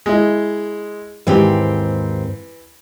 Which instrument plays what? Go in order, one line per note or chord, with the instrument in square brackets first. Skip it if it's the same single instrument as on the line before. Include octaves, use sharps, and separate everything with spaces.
[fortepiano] G#3 E4
[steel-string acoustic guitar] D#2 G#2 C4 [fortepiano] E3 G4